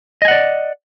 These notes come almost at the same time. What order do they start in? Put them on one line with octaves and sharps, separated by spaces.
D#5 G#5 F#5 D5